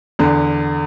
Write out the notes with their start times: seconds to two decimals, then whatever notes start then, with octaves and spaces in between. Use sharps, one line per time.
0.19 E2 D3